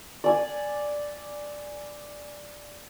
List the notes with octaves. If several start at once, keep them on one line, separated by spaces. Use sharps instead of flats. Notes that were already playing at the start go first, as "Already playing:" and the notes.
D5 G#5